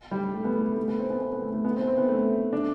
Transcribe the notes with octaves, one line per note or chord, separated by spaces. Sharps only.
G3
A3
B3
A3
A3
A3
B3
C4
B3
B3
B3
A3
A3
B3
C4
B3
C4
B3
A3
D4